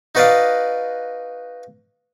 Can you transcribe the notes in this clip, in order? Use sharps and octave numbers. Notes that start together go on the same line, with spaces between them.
D#4 F#4 B4 D5 D#5 F5